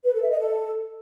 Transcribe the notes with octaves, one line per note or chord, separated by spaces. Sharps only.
B4
A4
E5
D#5
A4